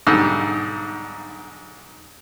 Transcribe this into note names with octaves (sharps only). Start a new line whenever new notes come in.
B1 G#2 D3 G3 D4 E6